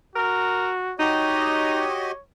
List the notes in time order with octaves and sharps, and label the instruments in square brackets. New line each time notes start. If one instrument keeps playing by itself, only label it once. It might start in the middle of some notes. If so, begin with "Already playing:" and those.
[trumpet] F#4 [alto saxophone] A#4
[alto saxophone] D#4 [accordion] F#4 G4 D#5 [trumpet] C#5